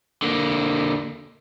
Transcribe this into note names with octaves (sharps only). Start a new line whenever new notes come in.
D3 A#3